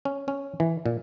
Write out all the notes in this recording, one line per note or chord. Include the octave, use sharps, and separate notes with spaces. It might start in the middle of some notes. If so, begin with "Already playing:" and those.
C#4
C#4
E3
A#2